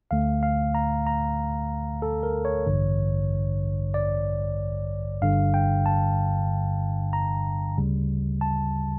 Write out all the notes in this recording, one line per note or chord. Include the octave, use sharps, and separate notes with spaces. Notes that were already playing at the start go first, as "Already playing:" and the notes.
D2 D3 A3 F5
F5
A#5
A#5
A4
A#4
C#5
A1 G2 D3
D5
G1 G2 D3 F5
G5
A5
A#5
D2 C#3 G3
A5